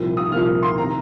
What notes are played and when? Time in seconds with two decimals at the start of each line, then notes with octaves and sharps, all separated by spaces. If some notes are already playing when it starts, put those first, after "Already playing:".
Already playing: C2 A#2 F3
0.17 D#6
0.32 C2 A#2 F3 F6
0.63 C6
0.78 C3 D#3 A#5